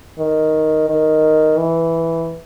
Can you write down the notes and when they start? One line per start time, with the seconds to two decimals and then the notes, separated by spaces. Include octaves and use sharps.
0.18 D#3
0.89 D#3
1.58 E3